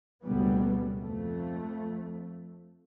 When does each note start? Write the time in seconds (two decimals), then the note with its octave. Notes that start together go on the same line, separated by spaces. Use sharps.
0.23 F#1 D2 B2 F#3 G3 B3
0.99 F2 A3